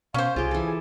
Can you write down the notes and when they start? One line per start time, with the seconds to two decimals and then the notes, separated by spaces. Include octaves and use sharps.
0.14 B2 C#4 C5 F5
0.36 C2 F4 G4 G#4
0.51 E3 A4